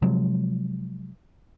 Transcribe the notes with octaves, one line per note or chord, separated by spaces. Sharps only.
C3 F3 F#3 G#3